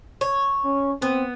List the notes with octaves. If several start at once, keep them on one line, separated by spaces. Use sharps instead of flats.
C#5
C#4
B3 C4